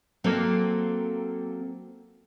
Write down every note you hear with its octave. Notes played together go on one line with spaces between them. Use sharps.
F#3 A#3 C4 A4 G5